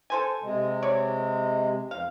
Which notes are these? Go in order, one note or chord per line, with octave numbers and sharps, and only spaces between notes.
A4 C5 G#5
C3 G#3
C#5 D5
F2 F5